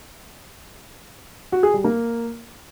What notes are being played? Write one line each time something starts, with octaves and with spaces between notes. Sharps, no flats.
F#4
G#4
G3
A#3